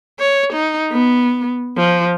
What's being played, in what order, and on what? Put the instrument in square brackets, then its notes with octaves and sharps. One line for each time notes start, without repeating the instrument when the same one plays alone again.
[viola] C#5
D#4
B3
F3